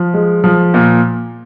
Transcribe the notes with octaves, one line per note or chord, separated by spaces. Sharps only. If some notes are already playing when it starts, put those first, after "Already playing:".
Already playing: F3
G#3
F3
A#2